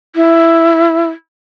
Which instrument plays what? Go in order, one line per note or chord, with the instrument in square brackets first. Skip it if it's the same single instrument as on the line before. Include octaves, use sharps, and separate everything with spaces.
[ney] E4